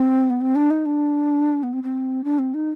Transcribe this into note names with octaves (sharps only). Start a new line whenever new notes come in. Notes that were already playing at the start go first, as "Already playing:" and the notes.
Already playing: C4
B3
C4
D4
D#4
D4
B3
C4
C4
D4
C4
D#4